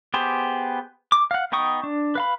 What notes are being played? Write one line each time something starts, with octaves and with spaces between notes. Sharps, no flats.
B3 G4 G#4 C5
D6
F5 F#5
B3 D#4 G5 C#6 D#6
D4
B4 F5 B5